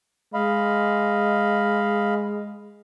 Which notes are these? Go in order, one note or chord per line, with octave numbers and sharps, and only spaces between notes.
G#3 D#5 F5 B5